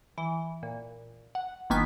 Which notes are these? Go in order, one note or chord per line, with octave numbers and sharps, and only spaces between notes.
E3
A#2
F#5
G1 D#3 A#3 B3 G#5 B6